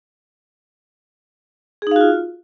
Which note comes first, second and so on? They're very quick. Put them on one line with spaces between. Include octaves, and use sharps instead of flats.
G#4 D#4 F5 F#4 F4